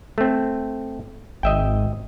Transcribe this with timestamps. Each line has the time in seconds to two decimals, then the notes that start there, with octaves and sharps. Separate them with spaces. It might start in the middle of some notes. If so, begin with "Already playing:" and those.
0.18 A3 C4
1.43 G#1 D#5 E5 G5